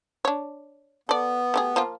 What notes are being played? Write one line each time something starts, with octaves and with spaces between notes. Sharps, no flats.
D4 C#5
B3 A4 D5
A3 G4 G#4
F3 A#3 F4